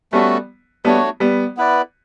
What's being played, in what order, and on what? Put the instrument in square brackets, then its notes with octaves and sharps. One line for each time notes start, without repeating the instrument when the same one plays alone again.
[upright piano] G3 B3 [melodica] A3 C#4 F#4 A4
[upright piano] G3 B3 [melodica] A3 D4 F#4 C#5
[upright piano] G3 B3
[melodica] B3 E4 B4 D5